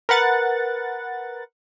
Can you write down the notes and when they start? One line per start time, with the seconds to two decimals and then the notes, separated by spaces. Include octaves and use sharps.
0.09 A#4 B4 F#5 A6